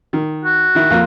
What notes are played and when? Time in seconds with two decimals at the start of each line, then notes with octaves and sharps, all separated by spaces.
0.13 D#3
0.45 F#4
0.75 D#3 E4
0.90 F2 A#3 F4